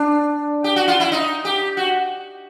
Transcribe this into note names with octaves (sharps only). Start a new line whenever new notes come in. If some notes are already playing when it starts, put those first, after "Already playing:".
Already playing: D4
G4
F#4
F4
E4
D#4
G4
F#4